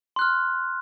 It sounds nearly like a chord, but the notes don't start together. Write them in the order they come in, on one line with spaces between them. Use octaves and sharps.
C6 F#6 F6